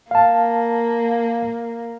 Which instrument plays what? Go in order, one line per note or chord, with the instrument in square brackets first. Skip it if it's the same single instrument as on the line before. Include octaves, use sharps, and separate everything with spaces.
[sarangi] A#3 [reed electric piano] F5 A5